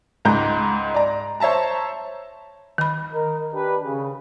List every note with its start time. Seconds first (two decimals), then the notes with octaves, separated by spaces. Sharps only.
0.25 C#2 G#2 A#5 G6
0.94 D5 A#5
1.40 C5 C#5 E5 A5 A#5
2.78 D#3 B5
3.13 A#4 D#5
3.53 D4 G4 B4
3.84 C#3